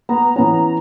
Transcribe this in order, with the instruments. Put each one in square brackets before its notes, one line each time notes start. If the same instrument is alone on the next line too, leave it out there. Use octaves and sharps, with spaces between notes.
[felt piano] B3 [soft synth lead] A#5
[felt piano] E3 B3 C#4